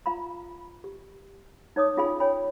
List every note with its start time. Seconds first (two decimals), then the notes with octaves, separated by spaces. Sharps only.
0.06 F4 F5 A#5 B5
0.84 G4
1.76 D#4 C#5 D6 D#6
1.97 C#4 F4 G#4 F5 G#5 B5
2.20 C#5 G5 G#5 B5